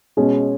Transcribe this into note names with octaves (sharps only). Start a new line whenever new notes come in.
B2 G#3 C#4